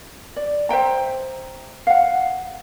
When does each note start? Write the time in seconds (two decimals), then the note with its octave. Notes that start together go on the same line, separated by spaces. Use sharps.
0.36 D5
0.69 C5 E5 G5 A#5
1.87 F5 F#5